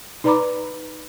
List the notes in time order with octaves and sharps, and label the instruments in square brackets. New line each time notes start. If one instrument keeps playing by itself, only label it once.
[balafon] D#4 B4 D5 A#5 B5 D6